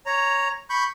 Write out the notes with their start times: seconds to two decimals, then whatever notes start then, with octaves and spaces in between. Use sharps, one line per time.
0.06 C#5 A#5
0.70 B5 C#6 G6